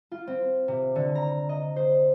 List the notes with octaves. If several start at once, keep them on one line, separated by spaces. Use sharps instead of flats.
F4
C4
C3
D3
A#5
D#5
C5